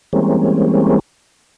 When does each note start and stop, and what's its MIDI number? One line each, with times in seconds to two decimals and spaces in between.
0.13 0.99 52
0.13 0.99 55
0.13 0.99 56
0.13 0.99 58
0.13 0.99 60
0.13 0.99 61